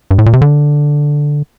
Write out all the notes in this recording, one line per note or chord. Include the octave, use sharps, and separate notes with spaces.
G2
A2
A#2
C3
D3